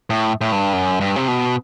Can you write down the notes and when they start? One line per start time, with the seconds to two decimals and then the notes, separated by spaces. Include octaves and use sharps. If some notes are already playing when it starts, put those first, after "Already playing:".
0.10 A2
0.41 A2
0.52 G2
0.73 F#2
1.01 G2
1.16 C3
1.28 B2